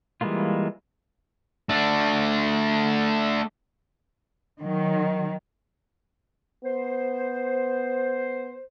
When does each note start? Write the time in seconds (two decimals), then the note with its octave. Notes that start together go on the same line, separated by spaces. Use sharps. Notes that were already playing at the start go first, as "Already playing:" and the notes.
0.21 E3 G3 G#3 A#3 F4
1.69 A3 D4
4.60 D#3 F#3
6.65 B3 C5